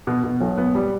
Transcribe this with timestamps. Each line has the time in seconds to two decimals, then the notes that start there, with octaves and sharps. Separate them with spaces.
0.07 B2
0.24 B2
0.41 B1
0.57 B3
0.75 G3